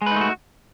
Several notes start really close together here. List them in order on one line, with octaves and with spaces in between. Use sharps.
G#3 B4 D#4 A3 F#4